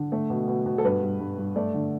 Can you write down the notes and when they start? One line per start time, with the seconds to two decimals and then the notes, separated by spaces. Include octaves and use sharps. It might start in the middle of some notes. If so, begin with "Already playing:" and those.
Already playing: D3
0.12 A3
0.30 B2
0.48 B2
0.66 B2
0.78 A4
0.84 G2 B4
1.02 G2
1.20 G2
1.38 G2
1.56 A3 D5
1.74 D3